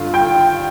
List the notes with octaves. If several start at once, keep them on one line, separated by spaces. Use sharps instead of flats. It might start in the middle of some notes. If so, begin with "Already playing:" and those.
Already playing: G2 D3 F4
G5